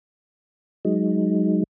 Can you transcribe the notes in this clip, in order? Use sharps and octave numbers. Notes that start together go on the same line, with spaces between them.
F#3 G#3 D#4